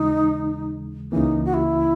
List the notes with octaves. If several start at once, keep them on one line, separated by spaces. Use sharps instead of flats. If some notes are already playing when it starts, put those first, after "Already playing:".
Already playing: D#2 C#3 E3 G#3 D#4
C#2 C#3 E3 A#3 D#4
F#4
E4